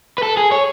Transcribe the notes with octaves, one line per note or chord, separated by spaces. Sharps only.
B4
A4
G#4
C#5